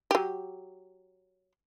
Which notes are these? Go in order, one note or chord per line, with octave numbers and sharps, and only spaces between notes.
F#3 G4